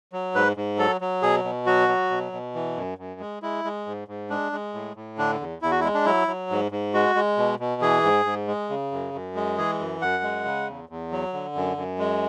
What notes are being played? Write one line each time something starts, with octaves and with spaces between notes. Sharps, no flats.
F#3
G#2 B4
G#2
F#3 A4
F#3
B2 G#4
B2
F#3 F#4
F#3
B2
B2
E3
F#2
F#2
G#3
G#3 E4
G#3
G#2
G#2
G#3 D4
G#3
A2
A2
D3 D4
E2
E2 E4
F#4
E4
G#3
D4
F#3 E4
F#3
G#2
G#2
G#3 F#4
G#3
B2
B2
E3 G#4
G#2
G#2
G#3
C#3
F#2
F#2
G#3
E3 G#4
F#2
F#2 F#5
G#3
C#3
E2
E2
F#3
D3
F#2
F#2
G#3